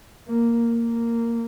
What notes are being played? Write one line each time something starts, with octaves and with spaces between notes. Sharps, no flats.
A#3
A#3